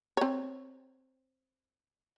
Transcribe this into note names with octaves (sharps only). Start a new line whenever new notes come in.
C4 C#5